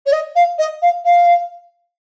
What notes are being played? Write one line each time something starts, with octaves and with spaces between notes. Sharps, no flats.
C#5
D#5
F5
D#5
F5
F5